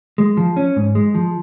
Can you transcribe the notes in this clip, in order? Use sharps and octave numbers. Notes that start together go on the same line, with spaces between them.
G#3
F3
C#4
G#2
G#3
F3